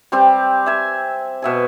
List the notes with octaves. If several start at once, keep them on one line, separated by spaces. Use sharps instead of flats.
G3 C4 G4
E5 G#5
B2 E5 G#5